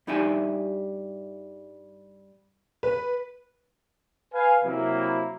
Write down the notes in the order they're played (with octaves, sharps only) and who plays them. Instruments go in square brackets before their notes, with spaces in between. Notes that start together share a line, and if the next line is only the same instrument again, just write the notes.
[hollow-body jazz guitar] G2 G3 D#4 G4 E5 G#5
[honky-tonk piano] B4
[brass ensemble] B4 F5 G#5
C3 F#3 A#3 E4